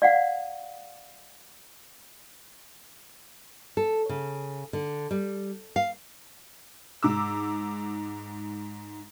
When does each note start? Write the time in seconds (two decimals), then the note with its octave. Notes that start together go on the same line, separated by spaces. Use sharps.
0.02 D5 F5 F#5
3.77 A4
4.09 C#3
4.73 D3
5.11 G3
5.76 F5
7.03 G#2 D6 E6